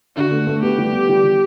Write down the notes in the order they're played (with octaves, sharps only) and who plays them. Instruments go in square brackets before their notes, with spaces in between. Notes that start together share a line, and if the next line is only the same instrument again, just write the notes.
[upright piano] D3 [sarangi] F#4
[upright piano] A3
A3
[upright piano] B3 [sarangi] G4
[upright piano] G3
B3
G3
G3